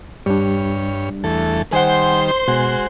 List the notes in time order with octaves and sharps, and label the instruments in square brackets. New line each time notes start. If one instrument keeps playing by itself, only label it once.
[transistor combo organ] G2 C#5 [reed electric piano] G3 D4
[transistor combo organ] E2 A3 A4
[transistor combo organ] D#3 G3 [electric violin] C5 C6 [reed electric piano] F#5 G#5
[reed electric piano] B2 G#5 [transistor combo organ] G#3 F#4